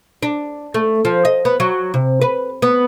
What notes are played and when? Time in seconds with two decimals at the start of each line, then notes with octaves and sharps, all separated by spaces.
0.23 D4
0.74 A3
1.05 F3
1.25 D#5
1.45 B3
1.60 F#3
1.94 C3
2.21 B4
2.62 B3